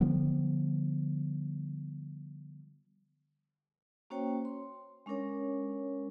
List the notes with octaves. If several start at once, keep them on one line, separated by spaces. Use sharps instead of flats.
D3 F3 G3 B3
A#3 C#4 F#4 C5 C#5 G5
C6
G#3 C#4 D4 A#4 C#5